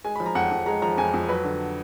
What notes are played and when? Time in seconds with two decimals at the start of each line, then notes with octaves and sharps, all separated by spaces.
0.04 G#3 G#5
0.16 F3 B5
0.26 A#5
0.35 F2 F#5
0.52 F2
0.66 G#3 A#5
0.82 F3 A#5
0.98 F2 G#5
1.13 F2
1.28 F#3 B4
1.44 D3